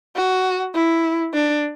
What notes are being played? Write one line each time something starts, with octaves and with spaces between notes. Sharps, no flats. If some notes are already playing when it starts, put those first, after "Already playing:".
F#4
E4
D4